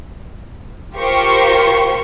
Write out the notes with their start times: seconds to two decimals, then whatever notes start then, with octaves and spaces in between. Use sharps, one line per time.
0.95 F4 G4 A#4 C5 C#6